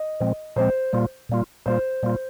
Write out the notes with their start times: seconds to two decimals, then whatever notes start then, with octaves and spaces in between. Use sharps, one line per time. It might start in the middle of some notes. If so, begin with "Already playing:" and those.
Already playing: D#5
0.20 A#2 F3 G#3 C4
0.56 A#2 F3 G#3 C4 C5
0.93 A#2 G3 A#3 F4
1.29 A#2 G3 A#3 F4
1.66 A#2 G3 A#3 F4 C5
2.03 A#2 G3 A#3 F4